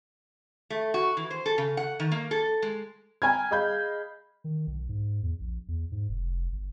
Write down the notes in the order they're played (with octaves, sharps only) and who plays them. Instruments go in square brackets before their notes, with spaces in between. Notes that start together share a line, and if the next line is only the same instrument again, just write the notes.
[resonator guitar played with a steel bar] A3
F#4
E3
C5
A4
C#3
F#5
D#3
A#3
A4
G#3
[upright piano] G5 G#5 A#5 B5 F6 G#6
G#4 D#5 F5 B5 G6
[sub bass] D#3
B1
G#2
E2
A#1
E2
G#2
F1
G1